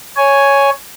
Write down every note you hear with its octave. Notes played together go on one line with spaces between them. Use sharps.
C#5 G#5